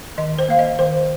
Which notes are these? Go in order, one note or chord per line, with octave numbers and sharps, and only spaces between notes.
D#3 D#5
C5
A#3 F5
D#5
D#3 C5